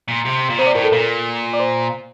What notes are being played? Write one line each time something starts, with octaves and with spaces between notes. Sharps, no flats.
A#2
C3
A#2
C3 C5
D5
A2 A#4
A4
A#2 A#4
D5
C5